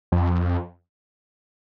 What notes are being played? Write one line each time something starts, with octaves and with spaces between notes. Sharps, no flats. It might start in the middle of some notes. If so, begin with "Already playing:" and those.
F2